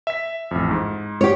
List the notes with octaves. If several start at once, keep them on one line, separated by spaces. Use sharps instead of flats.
E5 B6
A1 F2
G#2
G4 C#5